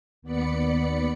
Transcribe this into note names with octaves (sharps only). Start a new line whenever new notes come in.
D#2 B3 D5 B5 C#7